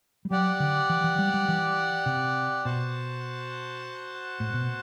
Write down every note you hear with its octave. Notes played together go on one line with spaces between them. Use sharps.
G3
F#3 G4 D5 F#5
D3
E3
E3
G3
G3
E3
C3
B2 F#4 C5 F#5 A5
A2
B2